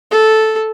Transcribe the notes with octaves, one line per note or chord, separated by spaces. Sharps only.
A4